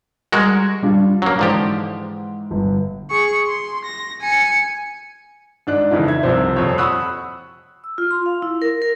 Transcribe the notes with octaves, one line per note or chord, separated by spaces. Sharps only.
G3 G#3 F#4 A#4 F#6 G#6
G3 D4 F4
F#3 A#3 C#4
G#2 D3 E3 F3 G4
G1
G#4 C#6
C6
A#6
G#5 C#7
G#2 D4 F#6
F2 C#3 E3 D#4
E5 G#6
C2 C3 F3 C5
D#1 F2 C5 C#5
F#5 B5 C#6 D#6 E6 F#6
E6
F4
C6
F5
E4
A#4
A#4